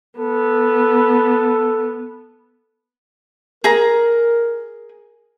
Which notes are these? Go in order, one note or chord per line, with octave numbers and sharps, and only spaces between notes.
B3 A4
G#4 A#4 A#5